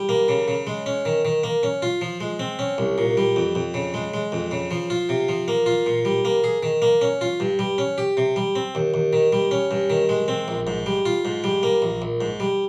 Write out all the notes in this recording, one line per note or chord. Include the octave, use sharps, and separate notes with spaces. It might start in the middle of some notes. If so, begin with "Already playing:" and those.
Already playing: G3
A#3
C#3
C#3
G#3
C#4
D#3
D#3
A#3
C#4
F4
F3
G#3
C4
C#4
C2
A#2
G3
F2
F2
C#3
G#3
G#3
F2
C#3
F3
F4
C3
F3
A#3
F4
A#2
G3
A#3
G#4
D#3
A#3
C#4
F4
G2
G3
C#4
G4
C3
G3
C4
D#2
D#2
D#3
G3
C#4
G2
D#3
G#3
C4
A#1
G#2
G3
F4
G#2
G3
A#3
A#1
A#1
G#2
G3